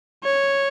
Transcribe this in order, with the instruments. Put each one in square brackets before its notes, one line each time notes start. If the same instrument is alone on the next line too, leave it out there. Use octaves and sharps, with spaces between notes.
[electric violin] C#5